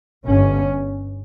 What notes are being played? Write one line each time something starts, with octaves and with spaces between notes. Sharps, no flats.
G1 G2 C#4